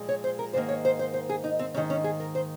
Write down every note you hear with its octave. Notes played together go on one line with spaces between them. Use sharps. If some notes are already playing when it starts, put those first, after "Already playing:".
Already playing: A#2 F3 G#3
C#5
C5
A#4
G#2 D#3 A#3 C5
C#5
C5
C5
C5
G#4
D#4
C4
G#2 D#3 A#3 C#4
C#4
G#4
A#4
C5